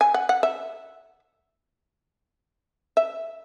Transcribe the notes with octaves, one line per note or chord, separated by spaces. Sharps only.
G#5
F#5
F#5
E5
E5